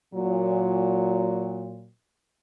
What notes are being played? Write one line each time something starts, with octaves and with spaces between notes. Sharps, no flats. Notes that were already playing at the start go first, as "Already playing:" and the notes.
A#2 F#3